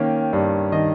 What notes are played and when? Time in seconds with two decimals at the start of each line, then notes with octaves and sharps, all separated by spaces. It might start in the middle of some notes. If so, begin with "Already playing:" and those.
Already playing: D#3 A#3 C#4 G5
0.33 G2
0.72 D#3 D#5